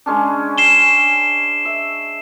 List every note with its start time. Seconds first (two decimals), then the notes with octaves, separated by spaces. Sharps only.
0.06 G#3 C#4 D4
0.58 C7 E7 G7
1.65 E5